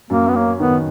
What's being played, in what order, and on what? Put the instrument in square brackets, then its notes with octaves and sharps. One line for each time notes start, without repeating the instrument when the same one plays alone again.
[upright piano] F#2 [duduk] A#3
[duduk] B3
[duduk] A#3 [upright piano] C#4
[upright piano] D#3 [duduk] B3